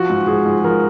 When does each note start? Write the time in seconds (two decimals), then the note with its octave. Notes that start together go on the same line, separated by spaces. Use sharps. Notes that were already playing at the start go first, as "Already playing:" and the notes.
Already playing: F3 F#4
0.09 G#2
0.27 F3 G#4
0.45 G#2
0.64 F3 A#4